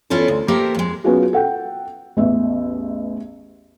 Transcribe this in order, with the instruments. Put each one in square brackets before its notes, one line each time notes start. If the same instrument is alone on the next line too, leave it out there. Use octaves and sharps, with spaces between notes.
[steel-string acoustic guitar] E2 C#4 E4 F4 A4
D2
A#3 G4 A4 A#4 C5 E5
F2 G#3
[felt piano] F#3 B3 C#4 F4 F#4 G#4
A4 F#5 G5
A1 E2 E5